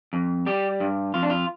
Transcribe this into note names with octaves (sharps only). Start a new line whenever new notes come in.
F2
G3 G4
G2
F2 F4
D4
F4